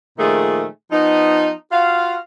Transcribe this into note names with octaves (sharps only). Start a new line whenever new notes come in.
A#2 D#3 F3 A3 G#4
F3 B3 D#4
F4 F#4 F5